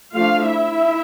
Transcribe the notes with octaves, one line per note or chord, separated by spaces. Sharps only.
F3 A3 D4 F4 F5
E4 E5